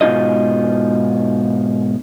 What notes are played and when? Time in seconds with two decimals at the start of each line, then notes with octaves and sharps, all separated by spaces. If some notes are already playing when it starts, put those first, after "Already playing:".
0.01 G#2 B2 D#4 F4 D#5